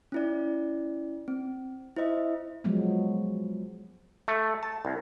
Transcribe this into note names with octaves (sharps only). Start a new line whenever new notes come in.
C#4 E4 D5
C4
E4 C5 D#5 E5
F3 F#3 G#3 B3
A3
A5
C2